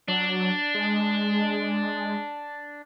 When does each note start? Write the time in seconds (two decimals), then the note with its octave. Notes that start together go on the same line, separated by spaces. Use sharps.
0.08 F#3 D4
0.74 G#3